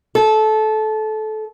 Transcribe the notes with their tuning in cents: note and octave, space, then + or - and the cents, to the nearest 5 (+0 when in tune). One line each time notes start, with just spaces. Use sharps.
A4 -20